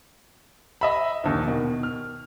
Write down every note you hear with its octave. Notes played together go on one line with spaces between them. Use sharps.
D#5 E5 B5
A#1 D#2
B2 D#3
F6